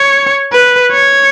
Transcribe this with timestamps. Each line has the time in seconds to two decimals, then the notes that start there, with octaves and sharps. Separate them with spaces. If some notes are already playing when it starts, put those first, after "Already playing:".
Already playing: C#5
0.53 B4
0.92 C#5